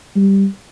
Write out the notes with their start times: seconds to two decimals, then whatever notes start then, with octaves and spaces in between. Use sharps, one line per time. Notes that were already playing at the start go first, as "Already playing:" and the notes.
0.16 G3